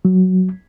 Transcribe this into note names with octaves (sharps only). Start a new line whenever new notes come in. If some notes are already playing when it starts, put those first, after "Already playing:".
F#3